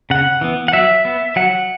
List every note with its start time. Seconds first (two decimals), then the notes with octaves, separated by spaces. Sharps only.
0.10 C#3 F#5
0.41 E3 B3
0.68 F#5
0.73 F#3 E5
1.05 B3
1.36 F#3 F#5